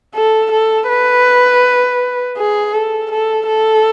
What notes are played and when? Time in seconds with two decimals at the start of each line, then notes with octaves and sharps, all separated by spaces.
0.15 A4
0.52 A4
0.89 B4
2.37 G#4
2.74 A4
3.11 A4
3.48 A4